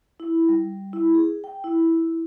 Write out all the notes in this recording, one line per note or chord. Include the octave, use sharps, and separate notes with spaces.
E4
G3
E4
G#4
G5
E4